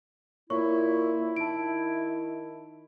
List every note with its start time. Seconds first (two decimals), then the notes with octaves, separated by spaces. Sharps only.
0.50 A#2 E4 F4 C#5 C#6
1.36 D#3 A5 D7